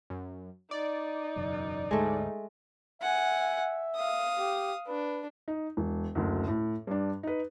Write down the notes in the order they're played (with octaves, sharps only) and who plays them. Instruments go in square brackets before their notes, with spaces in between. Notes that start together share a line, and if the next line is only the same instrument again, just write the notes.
[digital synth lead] F#2
[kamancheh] D#4 [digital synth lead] D5
[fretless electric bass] E1 F#2 C#3
[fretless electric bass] D2 G#2 [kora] G#3 A3
[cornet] E5 [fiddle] F#5 G#5
[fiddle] F5 D#6
[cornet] G4
[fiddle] D4 [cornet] B4
[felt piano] D#4
E1
F#1 D2
A2
G2 D4
D#4 B4